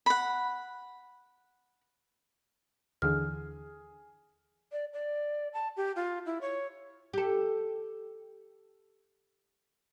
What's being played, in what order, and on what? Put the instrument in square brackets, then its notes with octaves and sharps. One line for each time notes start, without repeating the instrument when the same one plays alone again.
[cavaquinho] F#5 B5
[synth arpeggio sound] D#2 D3 E3 [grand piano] G#4 [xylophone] F6
[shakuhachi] D5
D5
A5
G4
F4
E4
C#5
[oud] G4 A4